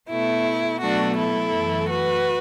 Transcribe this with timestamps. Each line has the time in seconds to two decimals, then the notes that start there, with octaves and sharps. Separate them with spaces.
0.09 B2 A3 E4
0.81 B2 F#3 A3 D4 F#4
1.17 E4 A4
1.53 F#2 E3 A3
1.88 F#4 B4